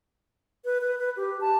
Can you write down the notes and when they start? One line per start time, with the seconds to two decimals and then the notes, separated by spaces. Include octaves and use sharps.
0.65 B4
0.81 B4
0.98 B4
1.17 G4
1.41 A5